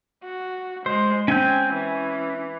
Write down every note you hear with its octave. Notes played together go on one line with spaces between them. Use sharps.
F#4
G#3 C5
C4 C#4 G#5 G6
E3